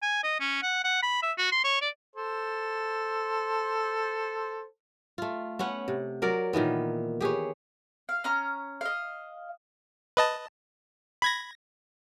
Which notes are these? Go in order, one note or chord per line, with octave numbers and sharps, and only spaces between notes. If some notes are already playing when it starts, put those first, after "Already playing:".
G#5
D#5
C#4
F#5
F#5
B5
E5
F#4
C6
C#5
D5
A4 C5
A3 F4
B3 C#4 F#5
C3
F#3 A#4 D5
A#2 D#3 E3 B3
G4 G#4 B4 C#5
F5
C#4 A#5 F6
D#5 F5
B4 D#5 A5
B5 G#6 A#6